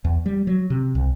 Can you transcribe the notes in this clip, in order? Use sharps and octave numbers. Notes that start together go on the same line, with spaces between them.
E2
G3
F#3
C3
C2